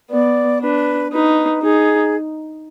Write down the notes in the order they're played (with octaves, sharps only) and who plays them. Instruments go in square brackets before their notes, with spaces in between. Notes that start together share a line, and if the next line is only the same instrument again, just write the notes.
[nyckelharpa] B3 [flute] D5
[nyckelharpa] D4 [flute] B4
[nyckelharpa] D#4 [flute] B4
[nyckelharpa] D#4 [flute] G#4